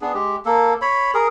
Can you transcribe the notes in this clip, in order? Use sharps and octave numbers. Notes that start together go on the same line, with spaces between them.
B3 D4 G#4
G#3 G4
A#3 A4
C#5 B5
G#4 A#4